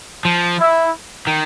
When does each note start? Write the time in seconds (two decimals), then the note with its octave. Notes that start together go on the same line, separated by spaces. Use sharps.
0.25 F3
0.59 E4
1.27 D#3